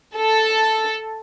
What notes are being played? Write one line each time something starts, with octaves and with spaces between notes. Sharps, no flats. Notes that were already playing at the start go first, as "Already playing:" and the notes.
A4